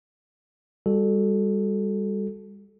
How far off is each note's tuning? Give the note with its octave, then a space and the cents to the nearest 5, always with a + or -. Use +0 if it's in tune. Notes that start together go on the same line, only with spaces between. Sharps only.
G3 +30 F#4 +10 A4 -10